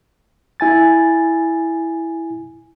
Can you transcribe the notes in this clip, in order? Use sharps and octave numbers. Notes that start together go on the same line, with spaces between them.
E4 G#5 A6